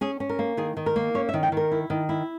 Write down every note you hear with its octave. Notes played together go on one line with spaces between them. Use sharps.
C#4 G#4
C#4
A#4
A#3
D#3 G#4
D#3
A#4
A#3
C#4 C#5
E5
D#3
G5
D#3 A#4
E4
D#3
E4